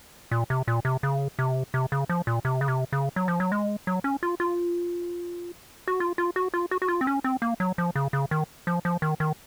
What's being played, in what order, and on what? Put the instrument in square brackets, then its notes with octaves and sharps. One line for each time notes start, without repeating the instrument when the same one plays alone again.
[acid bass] A#2
C3
A#2
C3
C#3
C3
C3
C#3
F3
A#2
C3
C#3
C3
C#3
F#3
F3
F#3
G#3
F#3
C#4
F4
F4
F#4
F4
F4
F#4
F4
F#4
F#4
F4
C4
C#4
C4
A#3
F#3
F3
C#3
C#3
D#3
F3
F3
D#3
D#3